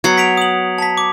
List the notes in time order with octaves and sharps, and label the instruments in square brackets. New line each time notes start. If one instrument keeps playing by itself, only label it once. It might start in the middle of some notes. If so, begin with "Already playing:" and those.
[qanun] F#3 B3 F#5 [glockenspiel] G#6 C7 C#7
[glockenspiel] B6 D7 F7
D#6 F#7
A5 B6
D6